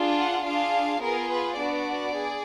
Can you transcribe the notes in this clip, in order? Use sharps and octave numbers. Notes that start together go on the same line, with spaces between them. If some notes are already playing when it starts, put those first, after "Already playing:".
Already playing: D4 F4 G#4
F#5
D4 F4 G#4 F5
B3 F4 G#4 A#4
B4
B3 D4 F#4 D5
G#4